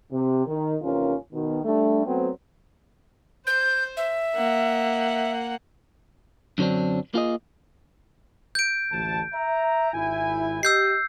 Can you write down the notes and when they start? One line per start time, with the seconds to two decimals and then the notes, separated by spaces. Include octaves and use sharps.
0.11 C3
0.47 D#3
0.82 D#2 C3 E3 C#4 F4 A#4
1.32 B2 D#3
1.64 G3 A3 D4
2.06 F#3 A3 B3 C4
3.47 C5 G6
3.97 E5
4.36 A#3 F#5
6.58 F#2 D3 F#3 C4 D4
7.14 A#3 F4 G#4 D#5
8.55 G6 D7
8.92 A1 D2 A5
9.34 E5 A#5
9.94 G#1 E4 G#5
10.63 G4 D#5 E6 G6 C7